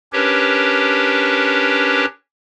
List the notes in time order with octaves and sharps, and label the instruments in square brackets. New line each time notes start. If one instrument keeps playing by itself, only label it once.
[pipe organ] C#4 D4 G4 A#4 B4 C#5